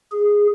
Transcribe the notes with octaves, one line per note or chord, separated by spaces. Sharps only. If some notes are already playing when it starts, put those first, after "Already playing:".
G#4